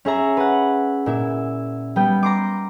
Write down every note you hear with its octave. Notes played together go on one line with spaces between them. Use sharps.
C#4 G#4 E5 A#5
B4 F#5
A#2 E4 E5
G3 B3 G5
A#5 C6 D6